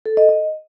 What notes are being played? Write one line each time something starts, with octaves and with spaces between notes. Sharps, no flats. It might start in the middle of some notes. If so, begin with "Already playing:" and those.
A4
D#5
D#5